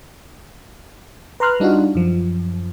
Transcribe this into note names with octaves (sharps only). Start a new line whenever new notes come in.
B4 A#5 C6 F6 F#6
G3 D4 D#4 F4 F#4
F#2 F3